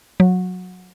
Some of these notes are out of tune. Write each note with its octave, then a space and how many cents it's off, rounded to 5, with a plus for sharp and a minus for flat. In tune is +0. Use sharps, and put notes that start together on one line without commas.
F#3 -20